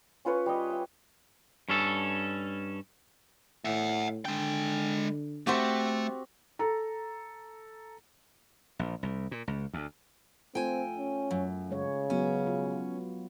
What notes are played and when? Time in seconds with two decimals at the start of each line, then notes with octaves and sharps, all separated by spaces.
0.25 C#4 F4 B4 C#5
0.46 G3 D#5
0.70 E5
1.69 G2 C#4 A4
3.65 A2 E5 F#5
4.25 D3 G#3 G5
5.47 A3 C4 F#4 G4
6.59 A4 A#5
8.79 A#1
9.03 C2
9.31 A#2
9.48 C#2
9.73 D2
10.55 A3 C4 F4 A4 G5 G#5
10.98 C#4
11.31 F#2
11.71 C#3 G#3 C#5
12.10 F#3 B3 C#4 F#4
12.47 F4